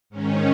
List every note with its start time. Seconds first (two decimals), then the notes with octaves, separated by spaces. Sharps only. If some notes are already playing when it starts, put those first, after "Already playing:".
0.10 G#2 D#3 C#4